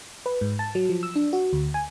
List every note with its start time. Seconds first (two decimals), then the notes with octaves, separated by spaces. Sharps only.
0.26 B4
0.41 G#2
0.59 A5
0.75 F#3
0.89 F3
1.03 E6
1.15 D4
1.33 F#4
1.53 D2
1.74 G#5